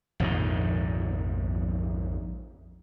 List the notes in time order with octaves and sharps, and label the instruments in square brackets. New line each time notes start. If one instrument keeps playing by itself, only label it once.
[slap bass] A#1 F2 G#2 D#3